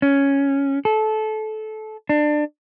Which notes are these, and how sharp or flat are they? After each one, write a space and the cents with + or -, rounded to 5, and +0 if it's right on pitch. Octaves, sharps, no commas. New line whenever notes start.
C#4 +0
A4 -20
D4 +25